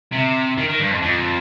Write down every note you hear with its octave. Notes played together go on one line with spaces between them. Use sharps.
C3
D#3
D#3
G2
F2
F2